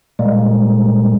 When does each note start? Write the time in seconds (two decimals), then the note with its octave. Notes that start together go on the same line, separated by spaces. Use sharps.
0.19 A#2 G3 G#3 A#3